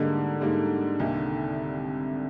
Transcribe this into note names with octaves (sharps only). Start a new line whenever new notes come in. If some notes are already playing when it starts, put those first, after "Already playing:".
Already playing: G#2 D3 G3 A#3 D#4
G#2 G3 A#3 D#4
C2 C3 D#3 A#3 D#4